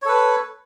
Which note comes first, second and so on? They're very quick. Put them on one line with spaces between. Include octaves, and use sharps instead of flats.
C#5 A4 B4